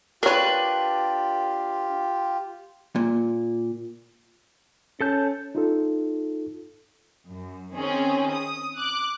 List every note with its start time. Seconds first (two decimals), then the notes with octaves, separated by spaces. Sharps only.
0.23 D4 F4 G4 A#4 B4 C#5
2.96 A#2
5.01 C#4 A4 A5 G6
5.55 D#4 F4 A4
7.29 F#2
7.74 D#3 C4 C#4 G#4
8.34 D#6
8.76 D6 F#6